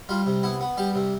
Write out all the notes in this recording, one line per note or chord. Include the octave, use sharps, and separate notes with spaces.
G3 F4
C3
B3 E4
B3
G3 G4
C3